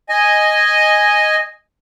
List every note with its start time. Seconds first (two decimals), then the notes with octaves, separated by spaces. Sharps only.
0.09 D#5 G#5